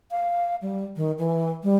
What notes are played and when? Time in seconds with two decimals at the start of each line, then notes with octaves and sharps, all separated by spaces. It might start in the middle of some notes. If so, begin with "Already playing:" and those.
0.11 F5
0.62 G3
0.96 D#3
1.18 E3
1.63 G3